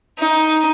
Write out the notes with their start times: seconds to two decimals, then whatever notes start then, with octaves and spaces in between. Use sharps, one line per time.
0.19 D#4